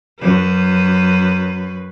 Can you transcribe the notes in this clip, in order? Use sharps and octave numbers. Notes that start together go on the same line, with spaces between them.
F#2 B4